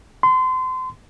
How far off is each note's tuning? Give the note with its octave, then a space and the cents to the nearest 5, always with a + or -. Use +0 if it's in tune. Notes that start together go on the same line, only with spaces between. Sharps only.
C6 -30